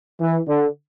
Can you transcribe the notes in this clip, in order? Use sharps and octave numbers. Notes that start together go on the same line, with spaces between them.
E3
D3